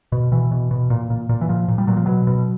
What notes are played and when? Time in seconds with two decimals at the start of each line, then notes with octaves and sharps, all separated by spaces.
0.12 B2
0.32 B2 E3
0.51 B2
0.71 B2
0.90 A#2
1.10 A#2
1.29 A#2
1.41 E3
1.49 A#2 F3
1.68 A#2
1.78 G3
1.87 A#2 F#3
1.97 F3
2.06 B2 F#3
2.27 B2